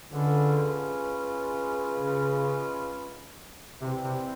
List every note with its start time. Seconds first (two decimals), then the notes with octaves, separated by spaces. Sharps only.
0.11 D3 G#3 C#4 F4 G#4 B4
1.97 C#3
3.81 C3 E3 G3 C4
4.04 C3